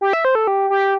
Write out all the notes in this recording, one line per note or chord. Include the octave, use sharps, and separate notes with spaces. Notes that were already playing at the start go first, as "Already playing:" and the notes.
G4
E5
C5
A4
G4
G4